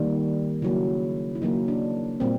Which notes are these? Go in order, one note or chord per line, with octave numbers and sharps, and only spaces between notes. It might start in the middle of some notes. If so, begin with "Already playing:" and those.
Already playing: D#3 G3 A#3
C#3 F#3 A#3 E4
E4
C#3 F#3 A#3 D#4
D4
A#2 G3 A#3 C4